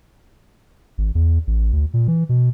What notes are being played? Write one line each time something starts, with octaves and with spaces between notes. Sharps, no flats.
G#1
E2
A1
D2
A#2
E3
B2